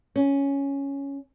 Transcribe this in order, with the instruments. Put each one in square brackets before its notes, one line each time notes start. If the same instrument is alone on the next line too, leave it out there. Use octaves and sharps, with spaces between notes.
[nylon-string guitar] C#4